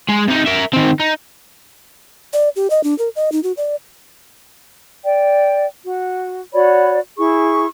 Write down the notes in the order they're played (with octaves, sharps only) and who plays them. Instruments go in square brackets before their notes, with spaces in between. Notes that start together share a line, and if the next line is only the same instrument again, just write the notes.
[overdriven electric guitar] G#3
C3 D#4
A#4 E5
D#3 C4
D#4
[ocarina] D5
G4
D#5
D4
A#4
D#5
D#4
F#4
D5
[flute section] D5 G5
F#4
F#4 C#5 D5 B5
E4 G#4 C#6